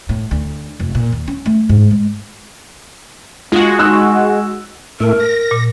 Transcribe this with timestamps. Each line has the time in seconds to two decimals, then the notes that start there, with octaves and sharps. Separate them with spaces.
0.09 A2
0.31 D2
0.80 F1
0.95 A#2
1.12 D#2
1.28 C#4
1.46 A3
1.69 G#2
1.91 G#3
3.52 G#3 F4 F#4
3.79 D#4 E6 F#6
5.00 A2 A3 A#4
5.20 A#6
5.51 A#2